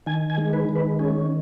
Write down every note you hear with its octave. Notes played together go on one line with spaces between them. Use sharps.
D#3 G#5
G#5
G#3
B4
D#3
B4
C#4 G#4